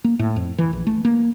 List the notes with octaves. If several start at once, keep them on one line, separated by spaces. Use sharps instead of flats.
A#3
A2
F2
E3
A#1
A3
A#3